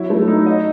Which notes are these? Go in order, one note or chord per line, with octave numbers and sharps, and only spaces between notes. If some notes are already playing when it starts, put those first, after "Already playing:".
Already playing: F#3 E4
A3
D#4
D#5